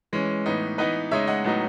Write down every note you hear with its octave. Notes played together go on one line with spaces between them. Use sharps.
E3 G#3 C#4
A2 E3 B3 D#4
E3 B3 D#4 B4 D#5
C#3 G#3 D#4 C#5 E5
D#5 F#5
A2 F#3 B3 D#4